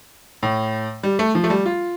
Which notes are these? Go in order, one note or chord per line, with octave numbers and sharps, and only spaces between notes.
A2
G3
A3
F3
A3
G3
F4